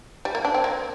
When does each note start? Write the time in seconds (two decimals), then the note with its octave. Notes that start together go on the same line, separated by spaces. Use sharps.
0.25 G3
0.35 A#3
0.45 D4
0.54 C4
0.64 A#3